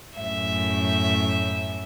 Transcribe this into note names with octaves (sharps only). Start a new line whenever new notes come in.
F#2 A2 E5